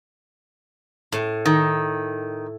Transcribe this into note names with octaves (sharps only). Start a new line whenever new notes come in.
A2
D#3